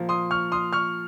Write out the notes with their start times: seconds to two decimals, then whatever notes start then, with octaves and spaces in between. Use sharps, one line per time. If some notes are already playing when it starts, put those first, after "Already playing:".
Already playing: A#2 F3 A#3
0.09 C6 D#6
0.31 C#6 F6
0.52 C6 D#6
0.73 C#6 F6